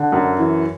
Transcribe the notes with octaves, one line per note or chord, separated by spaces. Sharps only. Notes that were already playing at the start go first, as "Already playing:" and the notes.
Already playing: D3
F#2
E3